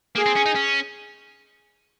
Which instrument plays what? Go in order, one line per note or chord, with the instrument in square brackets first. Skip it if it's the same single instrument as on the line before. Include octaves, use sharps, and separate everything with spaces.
[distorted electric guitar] A#3 [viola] G#4
[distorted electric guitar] C4
C#4
D#4
C#4